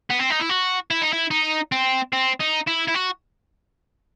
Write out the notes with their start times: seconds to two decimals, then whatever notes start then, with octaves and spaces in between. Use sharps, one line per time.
0.10 B3
0.20 C4
0.31 D#4
0.40 E4
0.50 F#4
0.91 E4
1.02 D#4
1.13 E4
1.31 D#4
1.72 C4
2.13 C4
2.40 D#4
2.67 E4
2.88 E4
2.94 F#4